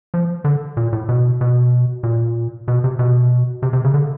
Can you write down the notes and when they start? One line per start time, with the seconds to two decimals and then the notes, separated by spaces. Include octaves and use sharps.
0.14 F3
0.45 D3
0.77 A#2
0.93 A2
1.09 B2
1.41 B2
2.03 A#2
2.68 B2
2.84 C3
2.99 B2
3.63 C3
3.73 C3
3.84 C#3
3.94 D3